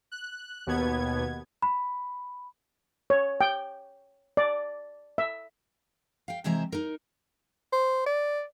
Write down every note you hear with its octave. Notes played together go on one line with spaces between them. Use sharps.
F#6
D#2 B2 B3 G#6
B5
C#5
G5
D5
E5
F5 G5
C3 E3 G#3 C5 E5 A#5
D#4 A#4
C5
D5